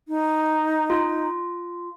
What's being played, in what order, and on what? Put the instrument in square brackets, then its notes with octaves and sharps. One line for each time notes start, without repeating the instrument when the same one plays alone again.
[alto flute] D#4
[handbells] F4